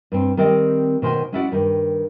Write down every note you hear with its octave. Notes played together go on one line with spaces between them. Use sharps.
G2 C4
D#3 G3 C4 D5 D#5
B2 D#3 C5 G5 G#5
G#3 C#4 E4 F#4 D5 F#5
G2 D#3